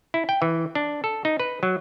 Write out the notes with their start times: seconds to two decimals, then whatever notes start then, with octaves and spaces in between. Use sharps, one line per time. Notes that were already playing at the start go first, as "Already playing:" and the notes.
0.14 E4
0.29 G5
0.42 E3
0.75 D4
1.04 A4
1.25 D#4
1.40 B4
1.63 F#3